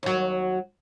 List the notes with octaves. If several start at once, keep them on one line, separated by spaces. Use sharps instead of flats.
D#2 F#3